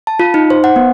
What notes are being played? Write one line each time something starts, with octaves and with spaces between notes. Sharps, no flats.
A5
F4
D#4
C5
F#5
B3